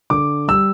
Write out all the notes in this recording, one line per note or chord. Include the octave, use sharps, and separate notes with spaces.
D3 D6
G3 E6